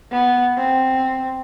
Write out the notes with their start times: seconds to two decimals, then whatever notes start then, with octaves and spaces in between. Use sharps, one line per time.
0.11 B3
0.57 C4